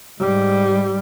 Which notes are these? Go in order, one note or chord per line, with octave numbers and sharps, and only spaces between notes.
G#2 G3